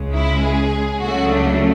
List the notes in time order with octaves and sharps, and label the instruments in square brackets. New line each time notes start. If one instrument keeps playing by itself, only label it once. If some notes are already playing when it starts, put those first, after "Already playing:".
Already playing: [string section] C#2 C#3 G#3
E4
G#4
C#2 C#3 F#3 A3 F#4
D4